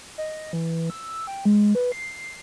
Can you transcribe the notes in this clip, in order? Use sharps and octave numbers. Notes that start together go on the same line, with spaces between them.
D#5
E3
E6
G5
G#3
B4
C7